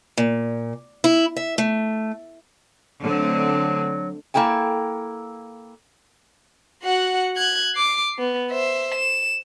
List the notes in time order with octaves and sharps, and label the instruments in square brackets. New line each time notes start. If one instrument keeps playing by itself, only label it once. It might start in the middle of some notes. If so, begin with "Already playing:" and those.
[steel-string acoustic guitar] A#2
E4
E5
A3
[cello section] D3 A3 C4 [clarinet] F#3
[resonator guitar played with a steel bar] A#3 E4 A4 G5 G#5
[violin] F#4 F#5
F#6 G#6
D6 C7
B3
C5 E5
E7